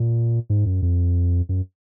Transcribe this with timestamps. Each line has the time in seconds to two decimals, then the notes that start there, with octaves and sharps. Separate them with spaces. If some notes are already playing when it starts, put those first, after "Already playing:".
Already playing: A#2
0.50 G#2
0.66 F#2
0.82 F2
1.49 F#2